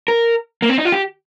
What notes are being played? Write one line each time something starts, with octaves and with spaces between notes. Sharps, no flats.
A#4
A#3
C4
D#4
F4
G4